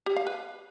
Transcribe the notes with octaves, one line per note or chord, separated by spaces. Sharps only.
G4
F5
B4